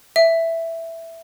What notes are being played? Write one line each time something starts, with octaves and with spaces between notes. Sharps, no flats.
E5